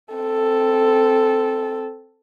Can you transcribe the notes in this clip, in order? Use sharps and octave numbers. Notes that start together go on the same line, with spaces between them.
C4 A4